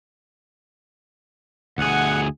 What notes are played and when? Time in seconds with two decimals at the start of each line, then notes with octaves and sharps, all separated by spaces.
1.78 D2 G#4 F#5